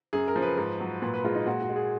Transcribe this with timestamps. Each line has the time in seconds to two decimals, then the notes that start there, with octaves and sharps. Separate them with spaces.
0.13 F#2 G#4
0.28 A#4
0.36 F3
0.42 B4
0.58 G#2
0.80 F#3
1.02 A#2 B4
1.14 B4
1.24 G#3 F4
1.35 D#4
1.46 A#2 F#4
1.62 F#4
1.69 G#3
1.76 G#4